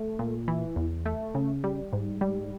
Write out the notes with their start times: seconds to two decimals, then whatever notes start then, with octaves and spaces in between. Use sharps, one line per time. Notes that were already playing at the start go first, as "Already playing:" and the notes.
Already playing: A3
0.19 A#2
0.48 E3
0.76 E2
1.06 A3
1.35 C#3
1.64 G3
1.93 G#2
2.21 G3